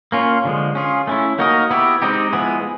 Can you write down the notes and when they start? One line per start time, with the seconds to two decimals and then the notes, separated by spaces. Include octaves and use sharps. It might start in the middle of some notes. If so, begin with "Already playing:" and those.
0.12 A#3 C#4 F4
0.45 D3 F3 G#3
0.75 C#4 F4 G#4
1.07 A3 C#4 E4
1.39 A#3 D#4 F#4 A#4 D#5
1.71 B3 E4 G4
2.02 G#3 C4 D#4 G4
2.33 F3 G#3 B3 E4 G#4